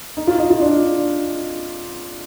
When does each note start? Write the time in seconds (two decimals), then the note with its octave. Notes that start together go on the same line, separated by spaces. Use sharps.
0.17 D#4
0.27 F4
0.39 D#5
0.50 F4
0.61 D4